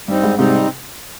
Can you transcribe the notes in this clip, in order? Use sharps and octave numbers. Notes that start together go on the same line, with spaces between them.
G2 G3 C4 D#4
G#2
G#2 C3 G3 C4 D#4